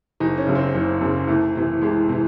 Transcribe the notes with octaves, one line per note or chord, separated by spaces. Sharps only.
F#1 D#4
C#4
F#2 C#3
C4
F#1
F#2 C#3
C2 A3
C3 E3
C2 G#3
C3 E3